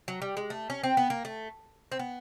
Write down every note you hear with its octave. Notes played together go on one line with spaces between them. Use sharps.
F#3
G3
G#3
A3
C#4
C4
B3
A#3
A3
C4
B3